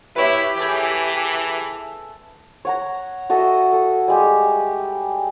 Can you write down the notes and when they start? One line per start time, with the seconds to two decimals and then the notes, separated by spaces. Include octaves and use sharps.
0.16 E4 G4 B4 C#5 E5
0.57 E3 G#4 A4 G5
2.65 C#5 F#5 A#5
3.30 F#4 A4 D#5 E5
3.73 A4
4.08 G3 G#3 G4